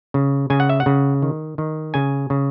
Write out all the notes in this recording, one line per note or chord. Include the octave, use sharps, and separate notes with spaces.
C#3
C#3 G#5
F#5
E5
F#5
C#3
D#3
D#3
C#3 G#5
C#3